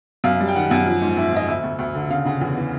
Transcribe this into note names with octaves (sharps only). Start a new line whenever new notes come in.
F#2 F5
G3
G5
D#3 F#5
F#2 F#5
F3
G#2
G#2 E5
F3 D#5
D2 E5
D2
D2
D3
C#3 F5
C#3 F#5
E2
E3